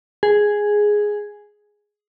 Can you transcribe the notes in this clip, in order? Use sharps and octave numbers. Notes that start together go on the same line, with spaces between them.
G#4